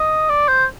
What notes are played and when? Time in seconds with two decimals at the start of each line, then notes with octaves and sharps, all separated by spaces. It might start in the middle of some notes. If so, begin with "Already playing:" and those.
Already playing: D#5
0.30 D5
0.48 C5